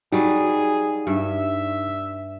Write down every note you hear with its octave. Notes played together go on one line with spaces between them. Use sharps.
F#3 G3 D#4 G#4
G2 E5